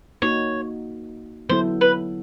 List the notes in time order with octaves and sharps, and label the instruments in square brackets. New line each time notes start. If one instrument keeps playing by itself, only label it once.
[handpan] A#3 D#4 F#4 [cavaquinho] C#5
[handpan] D3 F#3 B3 E4 A4 [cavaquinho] C5
[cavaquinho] B4